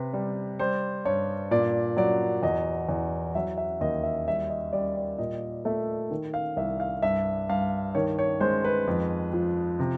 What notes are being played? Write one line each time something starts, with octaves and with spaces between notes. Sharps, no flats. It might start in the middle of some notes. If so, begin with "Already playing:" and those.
Already playing: C3 B4
G3
G3 C5
G2 C#5
A#2 D5
F#3 D5
E2 D#5
E2
F#3 E5
E5
D#2 D#5
E5
G3 E5
D#5
G3 D5
D5
A#2 D#5
A3 E5
D#3
F5
C2 E5
F5
G2 E5
G2 F5
D#3 C#5
C#5
G#3 C5
B4
F2
F3
C3